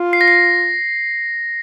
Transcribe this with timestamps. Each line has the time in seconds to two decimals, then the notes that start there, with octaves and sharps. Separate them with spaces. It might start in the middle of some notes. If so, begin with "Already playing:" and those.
Already playing: F4
0.13 C7
0.21 A#6
0.28 C7